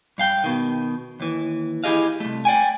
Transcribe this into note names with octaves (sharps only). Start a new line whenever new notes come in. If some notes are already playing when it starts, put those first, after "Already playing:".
G2 F5 G5
B2 D#3
D#2 E3
E4 G4 G#4 D#5 F5
C2 A3
D5 G5 G#5